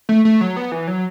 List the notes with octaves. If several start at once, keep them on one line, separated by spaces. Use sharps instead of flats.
A3
A3
F#3
B3
E3
F#3